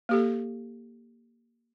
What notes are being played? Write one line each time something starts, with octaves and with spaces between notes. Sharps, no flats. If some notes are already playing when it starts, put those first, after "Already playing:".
A#3 G4 A4